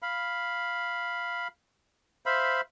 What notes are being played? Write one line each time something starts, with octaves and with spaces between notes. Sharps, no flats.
F5 B5
C5 E5 F5 B5